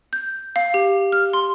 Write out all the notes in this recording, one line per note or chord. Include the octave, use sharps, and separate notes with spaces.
G6
F5
G4
F6
C6